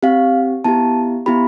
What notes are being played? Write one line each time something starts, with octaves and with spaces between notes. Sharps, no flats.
C4 G4 F5
B3 E4 G4 A5
B3 E4 G4 B5